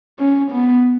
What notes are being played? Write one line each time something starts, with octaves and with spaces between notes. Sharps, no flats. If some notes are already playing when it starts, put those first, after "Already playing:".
C#4
B3